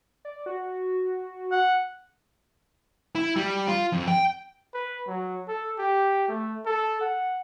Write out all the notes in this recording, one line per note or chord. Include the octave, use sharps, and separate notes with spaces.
D5
F#4
F#5
E4
G3
F4
F2
G5
B4
F#3
A4
G4
A3
A4
F#5